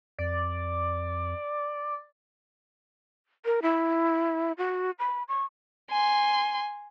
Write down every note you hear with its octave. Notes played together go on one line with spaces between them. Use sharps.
F2 D5
A#4
E4
F#4
B5
C#6
G#5 C6